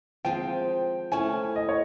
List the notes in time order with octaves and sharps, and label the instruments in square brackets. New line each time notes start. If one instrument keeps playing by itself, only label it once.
[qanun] F3 G#3 C4 F4 [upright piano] G5
[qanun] A3 C#4 E4 [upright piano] G#5
[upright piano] D#5
C#5